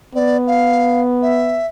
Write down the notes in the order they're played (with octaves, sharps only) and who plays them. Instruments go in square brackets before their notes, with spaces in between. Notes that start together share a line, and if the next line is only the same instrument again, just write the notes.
[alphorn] B3 [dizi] D5
[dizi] F5
E5